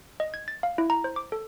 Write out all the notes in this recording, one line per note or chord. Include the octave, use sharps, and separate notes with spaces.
D#5
G#6
A6
F5
E4
A#5
C5
D6
A4